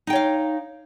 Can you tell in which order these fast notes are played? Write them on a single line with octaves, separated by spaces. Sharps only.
D#4 G5 C#5 F5